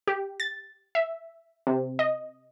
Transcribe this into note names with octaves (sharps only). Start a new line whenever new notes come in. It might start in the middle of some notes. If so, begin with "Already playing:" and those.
G4
A6
E5
C3
D#5